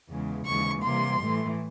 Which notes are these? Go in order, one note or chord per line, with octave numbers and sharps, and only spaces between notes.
E2 C#3 E3 G#3
D#2 C#3 E3 G#3 C#6
C3 E3 G3 A#3 C6
A2 E3 A3